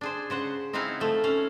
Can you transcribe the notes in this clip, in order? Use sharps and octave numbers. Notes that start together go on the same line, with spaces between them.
D4 G#4 C5
C#3 C5 F#5
C4 D#4 E4 F5 F#5 G#5
F3 A3
C#4 F5